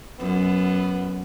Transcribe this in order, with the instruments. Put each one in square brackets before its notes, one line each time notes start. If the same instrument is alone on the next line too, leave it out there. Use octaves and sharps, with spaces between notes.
[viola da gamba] F#2 [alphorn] B3